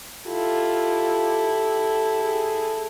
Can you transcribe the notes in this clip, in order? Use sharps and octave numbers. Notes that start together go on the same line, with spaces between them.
E4 F4 G4 A4
G#4